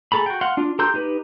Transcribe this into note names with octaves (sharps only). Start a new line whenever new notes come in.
G#4 A4 A#5 B5
F#4 G5
F5 F#5 C6
D4 F4
G4 A4 A#5 C6 G6
D#4 G4 B4